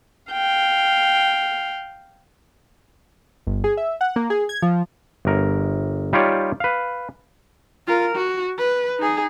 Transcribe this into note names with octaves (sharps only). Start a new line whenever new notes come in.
F5 G5
G1
G#4
E5
F#5
A#3
G#4
G#6
F3
G1 A#4
G3 D#4 F4 G4 C#5 D5
B4 F5
F4 A#4
F#4
B4
D#4 G#4